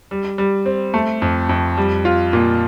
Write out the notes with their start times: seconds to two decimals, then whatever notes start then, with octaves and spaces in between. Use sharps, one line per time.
0.11 G3
0.38 G3
0.66 C4
0.94 A3
1.22 F2
1.49 F2
1.77 G3
2.05 F4
2.33 A#2